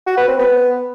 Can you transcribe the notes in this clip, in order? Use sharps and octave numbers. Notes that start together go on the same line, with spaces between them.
F#4
B4
C4
B3